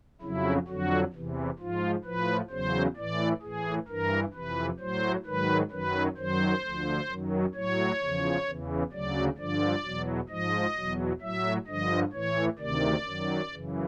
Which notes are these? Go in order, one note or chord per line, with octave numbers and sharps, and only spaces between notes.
F2 C#3 F#3 E4
F2 D3 F#3 F#4
E2 C3 E3
G#2 F3 F4
A2 F3 B4
E2 C#3 F#3 C5
A2 E3 D5
A2 E3 G#4
G2 E3 A#4
F2 C3 E3 B4
A2 F#3 C5
G#2 D#3 F#3 B4
F#2 D#3 F#3 B4
F#2 D#3 F#3 C5
D2 D3 F3
F#2 D#3 F#3
A2 F#3 C#5
E2 C#3 F3
E2 C#3 E3
D2 C#3 F#3 D5
G2 D3 F3 D5
E2 B2 F#3
G#2 F3 D#5
E2 B2 F#3
A2 F#3 E5
G2 D3 F3 D#5
A2 E3 C#5
D2 C3 D#3 D5
F#2 D#3 F#3
F#2 C#3 E3